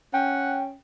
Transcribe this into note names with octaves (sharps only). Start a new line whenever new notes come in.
C#4 F#5 G5